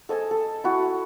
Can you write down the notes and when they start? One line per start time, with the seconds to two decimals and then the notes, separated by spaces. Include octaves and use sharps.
0.09 A4 D#5 G#5 A5
0.31 A4
0.64 E4 F#4 D#6